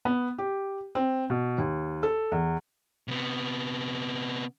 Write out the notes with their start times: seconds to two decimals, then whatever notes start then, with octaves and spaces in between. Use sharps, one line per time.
0.05 B3
0.38 G4
0.95 C4
1.30 B2
1.58 D#2
2.03 A4
2.32 E2
3.08 C3 B3